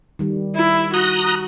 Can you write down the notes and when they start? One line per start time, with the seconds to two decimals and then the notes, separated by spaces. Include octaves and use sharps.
0.19 D#3 G3
0.55 E4
0.94 F#4 A#5 D#6 F#6